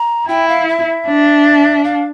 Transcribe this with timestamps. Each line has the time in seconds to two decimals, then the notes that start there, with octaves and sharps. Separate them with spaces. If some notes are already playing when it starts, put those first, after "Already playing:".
Already playing: A#5
0.29 E4 G5
0.48 F5
0.68 E5
1.07 D4
1.84 F5